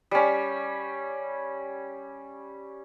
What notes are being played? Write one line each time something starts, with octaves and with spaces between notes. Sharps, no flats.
G3 C#4